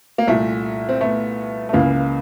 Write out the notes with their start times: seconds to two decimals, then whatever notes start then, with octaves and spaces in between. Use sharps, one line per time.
0.18 A#3
0.28 C2 A#2 A3
0.89 C4
1.01 A3 B3
1.69 A3
1.73 C#2 C#3 E3 A#3